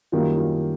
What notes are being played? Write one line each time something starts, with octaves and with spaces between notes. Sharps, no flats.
F#2 D#3 G3 A#3 F4
F4